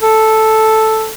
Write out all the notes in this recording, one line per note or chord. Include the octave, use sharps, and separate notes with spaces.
A4